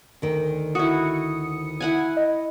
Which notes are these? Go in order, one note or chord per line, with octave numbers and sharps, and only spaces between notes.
D2 D#3
E4 F#4 D#6 C#7
E4 F#5 G#5
D#5